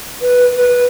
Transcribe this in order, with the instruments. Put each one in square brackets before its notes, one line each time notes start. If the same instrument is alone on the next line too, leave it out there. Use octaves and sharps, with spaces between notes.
[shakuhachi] B4
B4